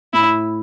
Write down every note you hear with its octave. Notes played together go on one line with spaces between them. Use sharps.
A2 E4